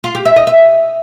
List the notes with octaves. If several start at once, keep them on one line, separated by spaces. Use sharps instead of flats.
F4
G4
E5
D#5
E5